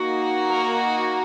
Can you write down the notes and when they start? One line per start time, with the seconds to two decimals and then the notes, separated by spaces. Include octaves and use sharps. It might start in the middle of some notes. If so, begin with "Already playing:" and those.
Already playing: A#3 D#4 F#4
0.49 A#4